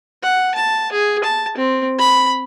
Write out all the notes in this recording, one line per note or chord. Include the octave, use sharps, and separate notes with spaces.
F#5
A5
G#4
A5
C4
B5